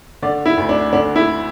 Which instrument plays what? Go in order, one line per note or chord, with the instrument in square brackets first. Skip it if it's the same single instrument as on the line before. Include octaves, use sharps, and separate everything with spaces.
[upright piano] D3 D5
E4
D2
D4
D3 D4
E4